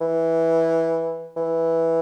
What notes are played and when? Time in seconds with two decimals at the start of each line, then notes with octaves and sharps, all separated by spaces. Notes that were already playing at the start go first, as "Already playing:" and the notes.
0.01 E3
1.37 E3